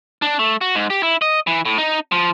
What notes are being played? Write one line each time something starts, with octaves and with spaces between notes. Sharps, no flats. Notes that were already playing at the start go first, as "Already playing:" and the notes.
D4
A3
F#4
G#2
G4
E4
D#5
E3
A2
D#4
F3